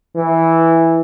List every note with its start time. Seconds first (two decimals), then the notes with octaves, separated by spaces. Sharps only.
0.16 E3